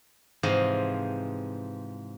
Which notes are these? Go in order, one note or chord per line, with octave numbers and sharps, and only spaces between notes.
G#2 C3 E3 F3 C4 D#5